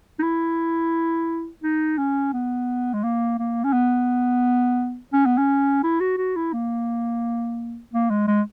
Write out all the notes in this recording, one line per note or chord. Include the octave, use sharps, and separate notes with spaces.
D#4
E4
D#4
C#4
B3
G#3
A#3
A#3
C#4
B3
C#4
B3
C#4
E4
F#4
F#4
E4
A#3
A#3
G#3
G#3